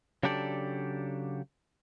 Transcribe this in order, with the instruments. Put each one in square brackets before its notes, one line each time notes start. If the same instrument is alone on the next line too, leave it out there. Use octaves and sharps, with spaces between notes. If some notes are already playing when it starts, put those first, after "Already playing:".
[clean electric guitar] C#3 F#3 D4 G4 A4 D5